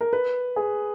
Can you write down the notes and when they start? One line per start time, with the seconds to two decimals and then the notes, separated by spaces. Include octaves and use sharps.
0.01 A#4
0.13 B4
0.56 G#4